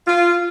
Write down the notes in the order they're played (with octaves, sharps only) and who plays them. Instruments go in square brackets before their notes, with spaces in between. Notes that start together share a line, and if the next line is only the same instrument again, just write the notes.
[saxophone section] F4